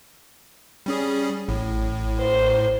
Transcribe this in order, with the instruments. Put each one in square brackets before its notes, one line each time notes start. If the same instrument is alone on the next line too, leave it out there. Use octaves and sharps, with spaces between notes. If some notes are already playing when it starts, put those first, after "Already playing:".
[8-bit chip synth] G3 C#4 G#4
[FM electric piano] A1 [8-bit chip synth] A2
[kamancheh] C5